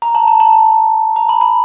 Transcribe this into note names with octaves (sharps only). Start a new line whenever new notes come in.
A#5
A5
A5
A5
A#5
B5
B5